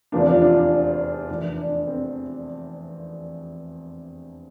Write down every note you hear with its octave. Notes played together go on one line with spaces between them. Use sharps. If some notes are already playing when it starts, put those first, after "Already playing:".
F1 E2 C3 F3 A#3 D4 F4
D4 F4
D4 F4
D4
F1 E2 E3 D4
D4
C4